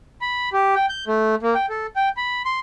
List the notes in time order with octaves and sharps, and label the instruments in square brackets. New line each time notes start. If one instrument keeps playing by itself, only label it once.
[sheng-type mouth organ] B5
G4
G5
G6
A3
A#3
G5
A4
G5
B5
C6